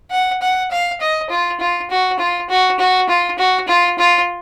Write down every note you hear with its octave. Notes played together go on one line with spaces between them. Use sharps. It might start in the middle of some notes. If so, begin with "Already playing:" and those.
F#5
F#5
F5
D#5
F4
F4
F#4
F4
F#4
F#4
F4
F#4
F4
F4